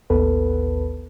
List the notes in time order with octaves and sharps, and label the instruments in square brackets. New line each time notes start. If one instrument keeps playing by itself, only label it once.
[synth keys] A1 D#2 B3 A4 B4